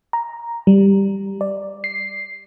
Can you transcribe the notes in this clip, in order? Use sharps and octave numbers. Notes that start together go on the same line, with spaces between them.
A#5
G3
D5
C7